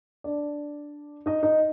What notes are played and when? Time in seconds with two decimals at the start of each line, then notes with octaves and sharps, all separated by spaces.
0.24 D4 D5
1.26 D#4 D#5
1.43 D#4 D#5